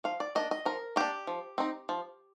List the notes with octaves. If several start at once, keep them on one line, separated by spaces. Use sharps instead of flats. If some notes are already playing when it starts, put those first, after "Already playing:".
F3 F5
D5
A#3 D4 D#5
D#5
F3 A#4
A#3 D4 G4
F3
C4 D#4
F3